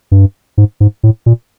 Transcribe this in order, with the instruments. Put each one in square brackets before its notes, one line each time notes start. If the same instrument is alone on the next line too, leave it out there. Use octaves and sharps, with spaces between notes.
[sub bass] G2
G#2
G#2
A2
A#2